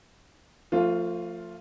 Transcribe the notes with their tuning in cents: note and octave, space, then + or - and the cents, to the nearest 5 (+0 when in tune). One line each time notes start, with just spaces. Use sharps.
F3 +0 A3 +30 F4 +0